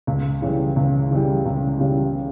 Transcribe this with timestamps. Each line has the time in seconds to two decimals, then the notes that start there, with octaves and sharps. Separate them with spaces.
0.07 C#2
0.42 C#3 E3 G3
0.76 C#2
1.11 C#3 E3 G3
1.45 C#2
1.80 C#3 E3 G3